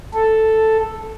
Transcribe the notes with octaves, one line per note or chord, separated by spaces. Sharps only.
A4